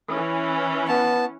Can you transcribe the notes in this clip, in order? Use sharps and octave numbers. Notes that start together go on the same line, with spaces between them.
E3 C#4
B3 A5